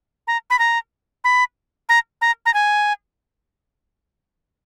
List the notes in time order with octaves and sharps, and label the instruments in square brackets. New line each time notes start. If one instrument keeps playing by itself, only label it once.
[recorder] A#5
B5
A#5
B5
A#5
A#5
A#5
G#5